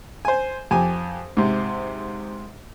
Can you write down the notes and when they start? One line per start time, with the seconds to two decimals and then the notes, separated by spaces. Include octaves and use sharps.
0.25 C5 G#5
0.71 F2 G4 G#5
1.37 G#2 C3